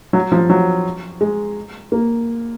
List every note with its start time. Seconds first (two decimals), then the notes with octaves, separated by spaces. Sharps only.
0.13 F#3
0.32 F3
0.50 F#3
1.21 G#3
1.92 A#3